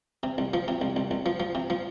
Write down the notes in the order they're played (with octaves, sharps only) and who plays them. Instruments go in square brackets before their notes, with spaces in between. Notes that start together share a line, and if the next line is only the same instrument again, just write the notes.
[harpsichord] C3
C2
F3
C3
C2
C2
C2
F3
F3
C3
F3